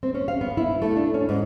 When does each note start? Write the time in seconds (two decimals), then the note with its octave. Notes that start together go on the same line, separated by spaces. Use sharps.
0.03 C4
0.15 C#4
0.28 F5
0.41 B3
0.57 E4
0.82 A3
0.96 D4
1.14 C#4
1.29 G#2